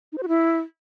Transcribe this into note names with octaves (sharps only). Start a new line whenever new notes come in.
D#4
C5
F#4
E4